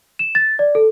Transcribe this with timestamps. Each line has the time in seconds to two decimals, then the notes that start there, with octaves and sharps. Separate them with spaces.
0.19 E7
0.35 A6
0.59 D5
0.75 A4